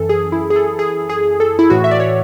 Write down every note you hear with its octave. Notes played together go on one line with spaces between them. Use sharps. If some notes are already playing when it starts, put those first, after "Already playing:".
Already playing: F#2 E3 A4
G#4
E4
G#4
A4
G#4
G#4
A4
E4
A2 E3 F#4
E5
D5
C#5